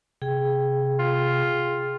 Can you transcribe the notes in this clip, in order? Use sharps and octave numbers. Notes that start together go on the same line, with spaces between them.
C3 G#4 G5
F4